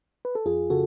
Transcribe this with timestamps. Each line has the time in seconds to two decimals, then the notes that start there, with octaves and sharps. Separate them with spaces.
0.25 B4
0.35 A4
0.45 F2 F4 G#4
0.70 C#3 F#4 A4